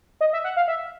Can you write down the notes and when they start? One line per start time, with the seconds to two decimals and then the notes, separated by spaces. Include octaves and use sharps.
0.21 D#5
0.33 E5
0.44 F#5
0.57 F5
0.68 E5